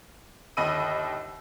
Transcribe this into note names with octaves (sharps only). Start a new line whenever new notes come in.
G1 D#2 D#5 B5 E6 D#7